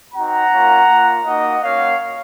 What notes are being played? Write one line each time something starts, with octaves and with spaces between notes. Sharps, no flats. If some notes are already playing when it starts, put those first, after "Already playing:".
C4 D#4 F#4 F#5 A#5
A#3 C#4 F4
A#3 F4
A#3 D#4 F#4 D#5 F#5
A#3 C#4 F#4 C#5 F5